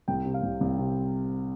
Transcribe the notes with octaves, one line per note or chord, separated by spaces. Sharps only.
C2 G5
C3
F5
C2
C2
C3